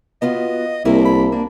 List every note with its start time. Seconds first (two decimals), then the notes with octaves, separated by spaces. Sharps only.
0.22 B3 F4 F#4 D#5
0.85 C2 A#3 E4 A4 A#4
1.05 B5
1.32 A#3 D4